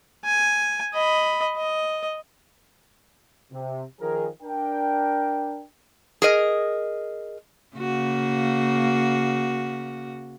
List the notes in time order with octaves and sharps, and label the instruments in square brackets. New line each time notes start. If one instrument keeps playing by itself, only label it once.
[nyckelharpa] G#5
D#5 B5
D#5
[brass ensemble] C3
D#3 F3 G#4 A#4
D4 A#4 G5
[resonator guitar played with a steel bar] G#4 A#4 D#5
[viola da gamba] C#3 A#3 F#4